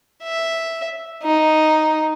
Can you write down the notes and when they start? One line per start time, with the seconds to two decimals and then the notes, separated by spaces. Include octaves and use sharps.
0.23 E5
1.23 D#4